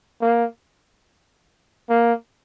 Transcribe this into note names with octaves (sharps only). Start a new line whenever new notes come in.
A#3
A#3